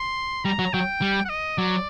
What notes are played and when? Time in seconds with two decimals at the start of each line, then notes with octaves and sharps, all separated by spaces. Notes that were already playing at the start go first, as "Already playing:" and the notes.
Already playing: C6
0.45 G3 A#5
0.59 F#3
0.73 F#3 G5
1.01 G3
1.25 F#5
1.29 D#5
1.58 F#3 D5